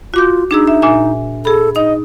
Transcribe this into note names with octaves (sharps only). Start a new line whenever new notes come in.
F4 F#4 D6 G6
D4 D#4 G#4 E6
E5
A#2 E5 G#5
G#4 A4 B5
D#4 D#5